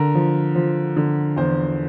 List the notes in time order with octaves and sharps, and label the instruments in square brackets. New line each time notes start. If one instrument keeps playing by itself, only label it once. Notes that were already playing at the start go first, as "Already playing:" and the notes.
Already playing: [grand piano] D3 A#4
F3
F3
D3
E2 C5